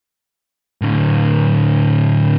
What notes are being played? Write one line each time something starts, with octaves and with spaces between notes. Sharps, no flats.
A2 D3